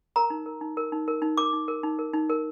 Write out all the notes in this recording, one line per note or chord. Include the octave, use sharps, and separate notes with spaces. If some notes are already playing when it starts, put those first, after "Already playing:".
A#4 A#5
D#4
A#4
D#4
A#4
D#4
A#4
D#4
A#4 D6
D#4
A#4
D#4
A#4
D#4
A#4